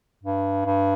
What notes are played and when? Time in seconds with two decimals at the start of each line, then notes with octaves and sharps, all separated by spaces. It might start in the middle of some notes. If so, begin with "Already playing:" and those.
0.23 G2
0.65 G2